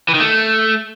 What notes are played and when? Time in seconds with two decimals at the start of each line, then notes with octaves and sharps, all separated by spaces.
0.08 E3
0.14 D#3
0.20 A3